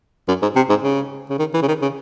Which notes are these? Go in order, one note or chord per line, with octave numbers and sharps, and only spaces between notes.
F#2
G#2
C3
G#2
C#3
C#3
D#3
E3
C#3
D#3
C#3